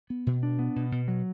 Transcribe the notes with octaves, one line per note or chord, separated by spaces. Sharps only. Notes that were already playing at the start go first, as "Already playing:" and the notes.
B3
B2
D4
B3
B2
B2
F#3